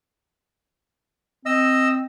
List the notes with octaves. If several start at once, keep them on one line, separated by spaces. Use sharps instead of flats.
C4 D#5 E6